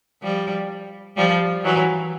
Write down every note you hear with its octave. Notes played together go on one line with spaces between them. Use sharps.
F3 G3
F3 G3
E3 F#3